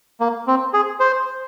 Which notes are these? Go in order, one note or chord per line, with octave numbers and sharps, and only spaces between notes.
A#3
C4
G#4
C5